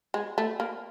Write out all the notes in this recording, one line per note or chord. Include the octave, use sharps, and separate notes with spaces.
G#3
A3
A#3